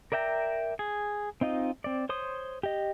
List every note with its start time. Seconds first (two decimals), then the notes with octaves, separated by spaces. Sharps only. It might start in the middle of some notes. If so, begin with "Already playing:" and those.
0.12 A#4 D5 E5 G5 A#5
0.79 G#4
1.41 C4 D#4 F4 D#5
1.84 C4 D5
2.09 C5 C#5 C6 D#6
2.63 G4 D#5